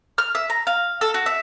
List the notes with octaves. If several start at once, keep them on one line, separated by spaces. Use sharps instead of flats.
F6
E5
A#5
F5
A4
F#4
E5